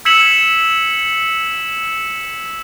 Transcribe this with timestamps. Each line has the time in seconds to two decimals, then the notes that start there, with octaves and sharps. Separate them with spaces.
0.05 E6 G#6 B6 C#7 E7 F#7